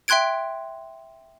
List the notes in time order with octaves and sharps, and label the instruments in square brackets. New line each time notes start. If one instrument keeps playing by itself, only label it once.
[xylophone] E5 G5 C6 F#6 G#6 D7